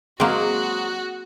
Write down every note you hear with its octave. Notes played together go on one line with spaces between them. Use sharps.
F#3 G#3 A#3 C4 F#4 G#4 A#5